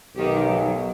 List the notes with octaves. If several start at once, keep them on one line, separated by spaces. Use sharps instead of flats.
B1 D#3 G4
F#3